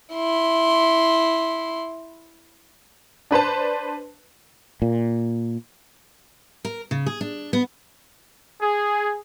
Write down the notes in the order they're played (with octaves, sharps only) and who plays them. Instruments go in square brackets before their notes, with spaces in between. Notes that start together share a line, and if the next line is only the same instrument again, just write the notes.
[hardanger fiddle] E4 C6
[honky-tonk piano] D4 B4 C5 A5
[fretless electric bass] A#2
[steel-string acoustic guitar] A#4
C#3
G#4
D4
B3
[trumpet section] G#4